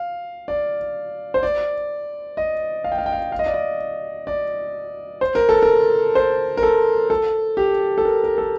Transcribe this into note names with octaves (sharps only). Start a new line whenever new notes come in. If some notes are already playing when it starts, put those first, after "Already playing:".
Already playing: F5
D5
C5
D5
D#5
F5
G5
F5
G5
F5
F5
D#5
D5
D#5
D5
C5
A#4
A4
A#4
C5
A#4
A4
A4
G4
A4
A#4
A#4
A4